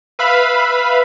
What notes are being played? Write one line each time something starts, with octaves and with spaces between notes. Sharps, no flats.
B4 E5 F5 B5